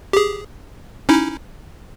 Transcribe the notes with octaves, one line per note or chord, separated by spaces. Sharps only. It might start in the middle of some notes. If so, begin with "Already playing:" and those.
G4 G#4
C#4 D#4 E4